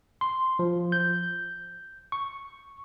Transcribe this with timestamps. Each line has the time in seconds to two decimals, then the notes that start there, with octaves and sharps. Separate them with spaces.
0.21 C6
0.59 F3
0.92 G6
2.12 C#6